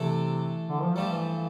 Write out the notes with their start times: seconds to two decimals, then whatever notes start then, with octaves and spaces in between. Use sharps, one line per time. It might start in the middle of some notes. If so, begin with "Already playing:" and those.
Already playing: C3 E3 A3 D4 A4
0.67 D3
0.82 F3
0.96 G2 F3 G3 A3
1.11 E3